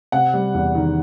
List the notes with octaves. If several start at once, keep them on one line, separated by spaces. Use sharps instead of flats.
C3 F#5
G3
E2
D#3